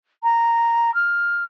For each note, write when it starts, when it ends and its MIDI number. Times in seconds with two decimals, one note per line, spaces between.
0.23 0.93 82
0.95 1.44 89